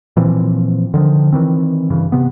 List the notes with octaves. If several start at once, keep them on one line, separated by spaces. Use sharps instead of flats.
A#2 E3 F3 C4
D3 D#3 F3
D#3 E3 C4
G2 C#3 E3
C3 B3